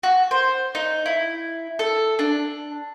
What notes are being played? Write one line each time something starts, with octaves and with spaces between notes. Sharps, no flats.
F#4
C5
D#4
E4
A4
D4